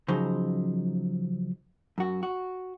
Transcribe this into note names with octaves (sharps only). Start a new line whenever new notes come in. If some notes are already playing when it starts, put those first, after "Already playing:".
C#3 F3 F#3 D#4 C5
F#2 F#4
F#4